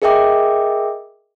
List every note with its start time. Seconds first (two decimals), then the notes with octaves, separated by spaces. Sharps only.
0.02 G#4 A#4 D#5 E5 G5 D6